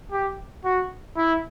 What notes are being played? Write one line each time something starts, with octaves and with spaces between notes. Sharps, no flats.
G4
F#4
E4